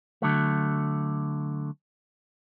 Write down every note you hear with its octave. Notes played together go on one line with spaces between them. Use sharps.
D3 F#3 A3